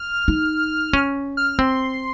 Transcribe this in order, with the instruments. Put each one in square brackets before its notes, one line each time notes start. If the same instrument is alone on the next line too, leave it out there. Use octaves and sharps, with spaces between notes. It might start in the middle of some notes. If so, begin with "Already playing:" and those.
Already playing: [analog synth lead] F6
[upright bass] D#4
C#4
[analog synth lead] F6
[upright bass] C4 [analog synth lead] C6